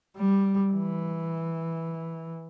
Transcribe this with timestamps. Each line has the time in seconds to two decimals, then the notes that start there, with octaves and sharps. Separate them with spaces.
0.17 G3
0.72 E3